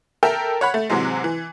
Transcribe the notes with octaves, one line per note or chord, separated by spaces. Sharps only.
A4 A#4 E5 G5
C#5 F#5 B5
A3
G#2 C3 E3 F#3 G#3
E3